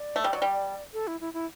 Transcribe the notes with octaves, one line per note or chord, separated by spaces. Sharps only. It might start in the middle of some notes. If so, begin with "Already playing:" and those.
Already playing: D5
A3
G3
F#3
G3
A4
E4
E4
E4